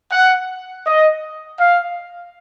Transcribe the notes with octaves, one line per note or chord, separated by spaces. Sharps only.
F#5
D#5
F5